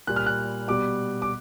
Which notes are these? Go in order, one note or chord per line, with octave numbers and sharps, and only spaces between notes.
A#2 G3 F#6
F6
F#6
B2 G3 D6
D6